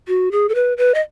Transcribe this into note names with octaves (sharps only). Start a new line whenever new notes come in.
F#4
G#4
A4
B4
B4
D#5